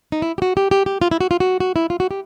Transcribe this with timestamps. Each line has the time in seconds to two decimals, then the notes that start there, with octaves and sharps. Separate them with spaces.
0.12 D#4
0.22 E4
0.38 G4
0.42 F#4
0.57 G4
0.71 G4
0.86 G4
1.02 F4
1.11 E4
1.21 F#4
1.31 F4
1.40 F#4
1.60 F#4
1.76 E4
1.90 F4
2.00 F#4
2.11 G4